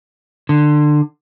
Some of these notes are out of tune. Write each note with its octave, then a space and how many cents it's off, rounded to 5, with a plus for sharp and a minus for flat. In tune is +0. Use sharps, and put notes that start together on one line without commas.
D3 +25